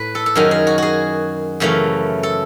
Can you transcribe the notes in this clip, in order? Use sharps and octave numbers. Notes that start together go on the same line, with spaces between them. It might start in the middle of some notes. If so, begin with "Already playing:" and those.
Already playing: A2 B4
A4
A4
F#2 D#3 F#3 G#4
G#4
F#4
F#4 G#4
F#2 C#3 E3 A3
A4